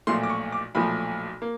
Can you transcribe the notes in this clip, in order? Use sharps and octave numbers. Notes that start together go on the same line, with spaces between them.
B1 A#2 F3 A3 C6
D6
C#6
D6
B1 A#2 F3 A3 B5
A#3